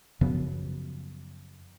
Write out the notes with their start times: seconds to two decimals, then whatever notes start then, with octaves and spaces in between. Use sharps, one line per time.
0.21 F#2 C#3 F3 B3